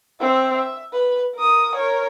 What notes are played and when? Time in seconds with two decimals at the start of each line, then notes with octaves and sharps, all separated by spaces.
0.20 C4 E5
0.56 E5
0.93 B4
1.35 A#4 D#6
1.75 A#4 C#5